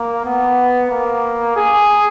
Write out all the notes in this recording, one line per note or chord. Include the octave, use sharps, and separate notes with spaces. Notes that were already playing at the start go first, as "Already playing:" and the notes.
Already playing: A#3
B3
A#3
G#4